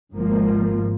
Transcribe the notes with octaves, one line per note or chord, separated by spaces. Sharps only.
G#1 G#2 F3 A#3